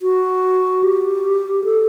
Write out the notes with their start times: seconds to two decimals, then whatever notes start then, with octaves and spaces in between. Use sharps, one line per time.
0.02 F#4
0.83 G4
1.64 A4